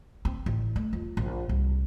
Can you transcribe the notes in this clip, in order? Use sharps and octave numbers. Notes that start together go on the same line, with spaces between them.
C4
A1
A3
F2
A#1
C2